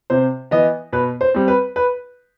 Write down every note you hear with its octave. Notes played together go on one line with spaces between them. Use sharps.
C3 C5
E3 B3 D#5
B2 B4
C5
G3 C4
B4
B4